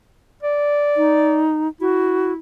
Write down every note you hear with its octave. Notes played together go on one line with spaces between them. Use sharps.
D5
D#4
E4 F#4